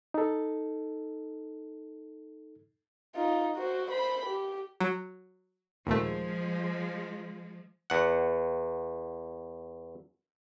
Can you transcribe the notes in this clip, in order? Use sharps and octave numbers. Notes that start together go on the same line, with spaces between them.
D#4 A4
D#4 F4
F#4 C5
C5 B5
G4
F#3
D#2 A#2 F3 G#3 A3
E2 F#5